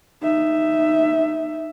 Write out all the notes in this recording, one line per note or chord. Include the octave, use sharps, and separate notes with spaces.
D#4 E5